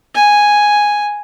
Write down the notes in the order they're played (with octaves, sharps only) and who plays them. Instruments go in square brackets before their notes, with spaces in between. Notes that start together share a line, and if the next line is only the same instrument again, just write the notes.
[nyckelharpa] G#5